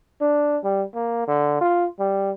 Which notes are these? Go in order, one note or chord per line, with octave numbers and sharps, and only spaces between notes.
D4
G3
A#3
D3
F4
G3